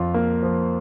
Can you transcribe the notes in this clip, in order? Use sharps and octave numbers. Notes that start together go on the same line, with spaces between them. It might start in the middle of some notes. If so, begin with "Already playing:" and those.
Already playing: F2 F4
A#3
F3